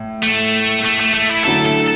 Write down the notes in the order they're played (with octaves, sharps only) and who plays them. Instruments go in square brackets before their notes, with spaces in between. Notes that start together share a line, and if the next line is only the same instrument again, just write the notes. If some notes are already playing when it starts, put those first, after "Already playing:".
Already playing: [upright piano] A2
[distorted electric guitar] A3
A3
A3
A3
E4
[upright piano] D3 F#3 A3 E4 [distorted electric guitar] A4
[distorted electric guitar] A4